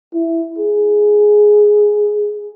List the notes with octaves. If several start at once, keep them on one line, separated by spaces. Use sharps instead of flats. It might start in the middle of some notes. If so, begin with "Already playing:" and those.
E4
G#4